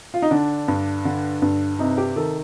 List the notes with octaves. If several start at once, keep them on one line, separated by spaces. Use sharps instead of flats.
F4
D#4
D3 D4
G2
D3
G2
C3 D#4
G4
D#3 A4